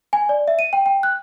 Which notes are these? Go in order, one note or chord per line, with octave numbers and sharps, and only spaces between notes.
G#5
D5
E5
D#7
G5
G5
F#6